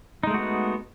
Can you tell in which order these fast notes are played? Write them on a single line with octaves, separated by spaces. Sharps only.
D#4 G#3 A3 F#4 B3